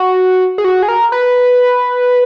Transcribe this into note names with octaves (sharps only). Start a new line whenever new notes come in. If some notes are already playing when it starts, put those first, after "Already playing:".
Already playing: F#4
G#4
F#4
G#4
A#4
B4